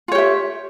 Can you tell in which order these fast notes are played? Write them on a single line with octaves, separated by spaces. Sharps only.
F4 C#5 G4 E5